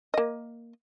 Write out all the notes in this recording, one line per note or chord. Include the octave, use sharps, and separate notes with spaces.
A#3 D#5